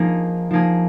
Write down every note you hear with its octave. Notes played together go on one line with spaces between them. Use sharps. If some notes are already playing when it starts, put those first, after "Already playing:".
Already playing: F3 A#3 D#4 G#4
F3 A#3 D#4 G#4